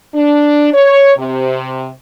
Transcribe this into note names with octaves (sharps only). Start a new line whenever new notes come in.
D4
C#5
C3